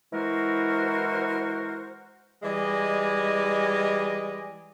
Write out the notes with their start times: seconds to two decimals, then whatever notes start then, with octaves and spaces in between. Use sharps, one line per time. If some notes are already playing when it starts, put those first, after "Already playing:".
0.12 E3 G#3 E4 F#4 A#4 C5
2.43 E3 G3 G#3 D5 D#5 G#5